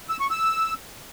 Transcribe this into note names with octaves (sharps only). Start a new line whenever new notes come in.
E6
C#6
E6